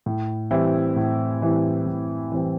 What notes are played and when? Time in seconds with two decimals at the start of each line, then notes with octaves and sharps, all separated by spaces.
0.06 A2
0.51 E3 G3 C4 E4
0.96 A2
1.42 E3 G3 C4 E4
1.86 A2
2.32 E3 G3 C4 E4